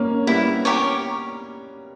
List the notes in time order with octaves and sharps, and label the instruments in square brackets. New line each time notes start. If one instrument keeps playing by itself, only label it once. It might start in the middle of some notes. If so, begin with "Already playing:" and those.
Already playing: [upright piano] A#3 C#4
[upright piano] G3 B3 [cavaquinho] E4
[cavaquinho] G4 A#4 C#5